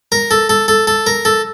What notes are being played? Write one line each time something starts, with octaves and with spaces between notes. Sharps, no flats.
A#4
A4
A4
A4
A4
A#4
A4